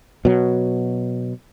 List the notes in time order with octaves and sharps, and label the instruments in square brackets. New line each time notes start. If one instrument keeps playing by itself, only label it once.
[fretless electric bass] B2 F#3